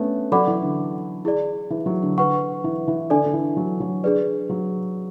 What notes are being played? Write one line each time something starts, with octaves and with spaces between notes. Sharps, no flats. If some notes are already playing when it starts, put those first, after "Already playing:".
Already playing: A3 B3 C#4 D4
F#3 A4 D5 F#5 B5 D6
E3
D3
E4 G#4 D5
E3
F#3
D3
D3 B4 F#5 C#6
E3
E3
D3 D4 A4 D5 G#5
D3
E3
F#3
F#3
D4 G#4 B4 D5
F#3